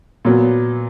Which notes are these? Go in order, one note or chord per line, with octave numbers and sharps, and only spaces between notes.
A#2 F#3 B3